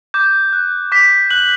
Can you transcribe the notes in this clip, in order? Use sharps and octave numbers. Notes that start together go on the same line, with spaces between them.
D6 G6
F#6
D6 B6
F#6 F#7